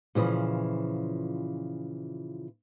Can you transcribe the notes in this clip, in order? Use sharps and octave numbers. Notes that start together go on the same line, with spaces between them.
A#2 C#3 E3 F3